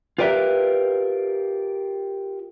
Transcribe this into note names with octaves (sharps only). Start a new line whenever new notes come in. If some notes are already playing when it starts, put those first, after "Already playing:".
F4 G4 A#4 B4 D5 E5